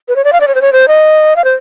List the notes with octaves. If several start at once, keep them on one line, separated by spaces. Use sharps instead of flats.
B4
C#5
D5
F5
D5
C#5
C5
C#5
C5
D#5
F5
C5